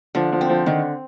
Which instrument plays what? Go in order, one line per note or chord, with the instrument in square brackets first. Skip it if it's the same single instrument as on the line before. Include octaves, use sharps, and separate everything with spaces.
[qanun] D3 [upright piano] F3
[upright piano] F3
[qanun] C4
[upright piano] F3
[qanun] D3 [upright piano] D#3